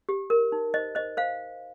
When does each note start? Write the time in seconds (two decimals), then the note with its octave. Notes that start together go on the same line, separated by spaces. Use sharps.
0.09 G4
0.30 A#4
0.52 D#4
0.74 C5 D#5
0.95 C5 D#5
1.17 C5 F5